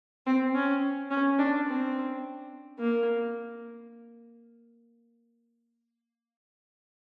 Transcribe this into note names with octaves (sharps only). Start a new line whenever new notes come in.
C4
C#4
C#4
D4
C4
A#3